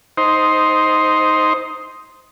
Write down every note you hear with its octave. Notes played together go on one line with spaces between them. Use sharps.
D#4 C5